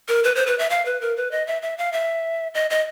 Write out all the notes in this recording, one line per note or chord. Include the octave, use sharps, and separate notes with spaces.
A#4
B4
C5
B4
E5
F5
B4
A#4
B4
D#5
E5
E5
F5
E5
D#5
D#5